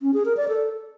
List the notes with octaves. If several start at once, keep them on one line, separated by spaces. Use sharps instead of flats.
C#4
G#4
A#4
D5
A4